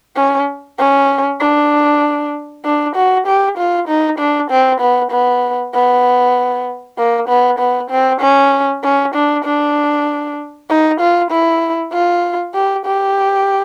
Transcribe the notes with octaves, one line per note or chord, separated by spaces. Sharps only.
C#4
C#4
D4
D4
F#4
G4
F4
D#4
D4
C4
B3
B3
B3
A#3
B3
B3
C4
C#4
C#4
D4
D4
D#4
F4
E4
F4
G4
G4